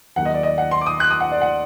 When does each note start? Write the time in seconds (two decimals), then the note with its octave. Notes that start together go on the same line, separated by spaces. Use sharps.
0.16 D#2 D#3 F#3 F#5
0.25 D#5
0.34 D5
0.43 D#5
0.58 F#5
0.71 C6
0.81 D6
0.86 D#6
1.00 F#6
1.11 D#6
1.20 F#5
1.32 D5
1.42 F#5